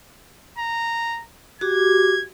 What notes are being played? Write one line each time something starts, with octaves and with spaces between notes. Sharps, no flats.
A#5
F#4 G4 D6 G#6